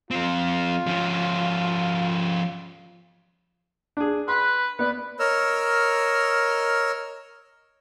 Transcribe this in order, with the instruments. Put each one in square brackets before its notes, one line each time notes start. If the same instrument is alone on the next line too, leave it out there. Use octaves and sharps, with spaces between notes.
[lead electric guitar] F3 C4 [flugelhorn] F4
[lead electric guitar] F3 C#4
[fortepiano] D4 G#4
[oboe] B4 [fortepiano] C6
[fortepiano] B3 D5 [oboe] B4
[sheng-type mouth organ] A#4 C#5 D#5 E6 F6